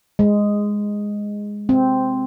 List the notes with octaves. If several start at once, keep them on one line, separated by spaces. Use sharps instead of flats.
G#3
C4